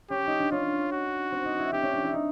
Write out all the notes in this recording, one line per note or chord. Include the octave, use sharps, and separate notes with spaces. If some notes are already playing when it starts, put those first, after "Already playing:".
C#4 G4
D#4
D4
C#4 F4
F#4
C4
D#4
E4
D4 G4
C#4
D4
E4
D#4